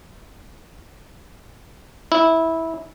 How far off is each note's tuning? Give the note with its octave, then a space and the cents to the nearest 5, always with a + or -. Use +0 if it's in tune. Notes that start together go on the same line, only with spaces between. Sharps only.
E4 -15